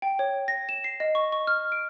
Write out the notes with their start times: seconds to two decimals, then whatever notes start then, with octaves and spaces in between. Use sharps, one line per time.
0.02 G5
0.19 C#5
0.48 A#6
0.69 E7
0.84 C7
1.00 D#5
1.15 C#6
1.32 C#6
1.47 F6
1.72 D7